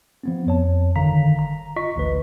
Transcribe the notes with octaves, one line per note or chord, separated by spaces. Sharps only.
F3 B3 C4
F2 C#5 A5
G1 D3 D#3 F5 A#5 B6
A#5
F4 D#5 C#6 B6
A1 D2 B4